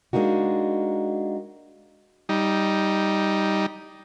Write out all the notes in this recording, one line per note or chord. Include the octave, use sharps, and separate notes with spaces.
G#3 A#3 D4 D#4 F#4
G3 D#4